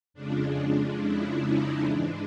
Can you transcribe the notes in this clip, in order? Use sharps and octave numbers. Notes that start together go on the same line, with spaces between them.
F2 C#3 F3 G#3 D4
E4
D#4
G#2 E3 G#3 D4